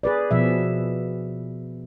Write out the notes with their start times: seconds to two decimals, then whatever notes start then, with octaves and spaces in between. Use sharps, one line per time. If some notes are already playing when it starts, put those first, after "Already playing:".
0.03 G#4 B4 D5
0.31 B2 F3 E5